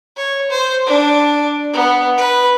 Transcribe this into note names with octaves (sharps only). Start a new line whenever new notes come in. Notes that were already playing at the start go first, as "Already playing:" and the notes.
C#5
C5
D4
B3
B4